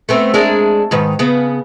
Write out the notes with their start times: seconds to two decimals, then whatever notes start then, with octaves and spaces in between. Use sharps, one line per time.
0.09 A3 B3 C4
0.34 G#3 D4 A#4
0.91 G#2 D#3 B4
1.19 C#3 B3